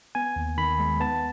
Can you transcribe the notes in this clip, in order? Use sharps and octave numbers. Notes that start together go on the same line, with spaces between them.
B3 G#5
D#2
D#3 B5
G#3
B3 A5